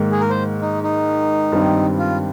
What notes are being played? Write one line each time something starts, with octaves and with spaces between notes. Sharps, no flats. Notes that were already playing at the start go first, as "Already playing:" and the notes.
Already playing: G#2 D#3 A#3
G#4
A#4
C5
D#4
D#4
G2 D#3 G3 C4
F4